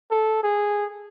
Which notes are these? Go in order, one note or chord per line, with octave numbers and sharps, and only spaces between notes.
A4
G#4